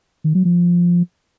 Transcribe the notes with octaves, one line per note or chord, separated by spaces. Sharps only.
D#3
F#3
F3